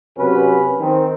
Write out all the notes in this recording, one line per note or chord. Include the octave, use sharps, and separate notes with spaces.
F#2 C3 F#3 B3 C#4 B4
D#3 C4